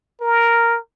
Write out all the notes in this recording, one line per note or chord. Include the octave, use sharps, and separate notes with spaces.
A#4